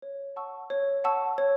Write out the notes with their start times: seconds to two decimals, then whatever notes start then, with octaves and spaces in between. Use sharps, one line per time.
0.02 C#5
0.36 F#5 A5 C#6 E6
0.70 C#5
1.04 F#5 A5 C#6 E6
1.38 C#5